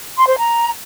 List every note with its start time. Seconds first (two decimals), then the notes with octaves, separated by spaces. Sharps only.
0.17 C6
0.27 C5
0.37 A#5